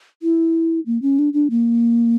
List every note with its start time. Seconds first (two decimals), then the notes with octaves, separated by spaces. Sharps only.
0.23 E4
0.86 A#3
1.02 C#4
1.19 D4
1.33 D4
1.50 A#3